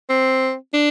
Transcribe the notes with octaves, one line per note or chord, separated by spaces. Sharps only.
C4
D4